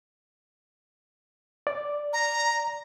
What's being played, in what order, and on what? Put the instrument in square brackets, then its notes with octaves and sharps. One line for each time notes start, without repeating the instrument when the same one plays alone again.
[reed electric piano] D5
[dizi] A#5